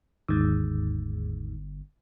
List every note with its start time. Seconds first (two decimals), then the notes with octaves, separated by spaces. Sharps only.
0.28 G1 D#2 G#2